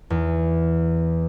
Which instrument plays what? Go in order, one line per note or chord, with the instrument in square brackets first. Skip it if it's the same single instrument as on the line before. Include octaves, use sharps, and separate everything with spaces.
[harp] E2